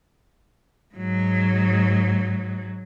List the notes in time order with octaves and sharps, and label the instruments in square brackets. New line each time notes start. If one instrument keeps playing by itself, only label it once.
[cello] G#2 F#3